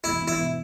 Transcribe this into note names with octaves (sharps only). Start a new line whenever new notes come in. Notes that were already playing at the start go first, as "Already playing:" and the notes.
E1 E4
E2
E4
B2